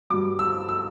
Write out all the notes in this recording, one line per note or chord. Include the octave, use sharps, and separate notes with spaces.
G2 F#3 D6
E6
E6